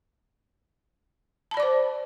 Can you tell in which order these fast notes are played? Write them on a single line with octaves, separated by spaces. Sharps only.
A5 B5 D5 D6 C5